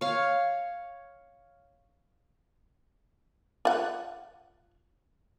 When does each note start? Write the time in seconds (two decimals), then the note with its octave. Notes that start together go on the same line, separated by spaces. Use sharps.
0.01 C#5 F5
3.65 F4 F#5